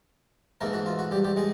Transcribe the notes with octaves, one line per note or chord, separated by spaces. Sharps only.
G#2 E3 A3 A#3 A#4
F#4
F4
F#4
G3 G4
G3 G4
G#3 G#4